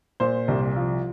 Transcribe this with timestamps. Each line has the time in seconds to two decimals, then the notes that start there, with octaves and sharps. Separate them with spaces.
0.20 A#2 C5
0.48 C2
0.76 F3